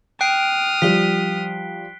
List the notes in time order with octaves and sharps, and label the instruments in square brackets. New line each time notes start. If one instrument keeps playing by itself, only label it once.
[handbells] G5 [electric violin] D#6 F6 [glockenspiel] F#6 C7 D7
[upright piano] F3 G3 [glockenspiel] B6 G7